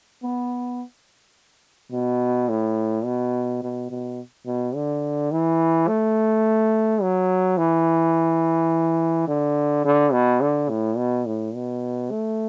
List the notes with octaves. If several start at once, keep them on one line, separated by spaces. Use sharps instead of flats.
B3
B2
A2
B2
B2
B2
B2
D3
E3
A3
F#3
E3
D3
D3
B2
D3
A2
B2
A2
B2
A3